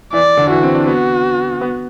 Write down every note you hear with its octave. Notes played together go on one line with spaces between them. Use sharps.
E3 D5
D3
E3 F#4
C4
D4
B3 F#4
B3